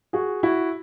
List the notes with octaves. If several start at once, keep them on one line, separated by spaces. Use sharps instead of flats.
F#4 G#4
E4 F#4